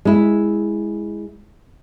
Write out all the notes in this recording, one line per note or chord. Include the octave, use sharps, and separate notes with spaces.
G#3 E4